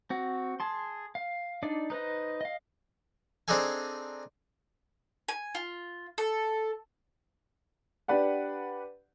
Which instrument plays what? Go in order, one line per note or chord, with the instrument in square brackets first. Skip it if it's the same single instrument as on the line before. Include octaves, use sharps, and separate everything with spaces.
[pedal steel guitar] C4 F#4
G#4 A5 C6
F5
D4 D#4 D5
D#4 B4 C5 D#5
D#5 F5
[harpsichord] C4 D4 D#4 G#4 A4 G#5
[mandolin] G#5
F4
A4
[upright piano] D4 G4 B4 D5 F#5